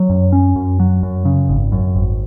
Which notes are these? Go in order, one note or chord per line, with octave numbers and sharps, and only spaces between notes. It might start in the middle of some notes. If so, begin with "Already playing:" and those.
Already playing: F#3
F#2
C#4
F#2
F#3
F#2
C#3
G#1
F#2
G#1